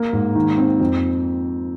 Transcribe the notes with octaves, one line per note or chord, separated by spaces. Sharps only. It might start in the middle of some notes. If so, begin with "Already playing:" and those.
Already playing: A#3
G#2
D#3
C4
F2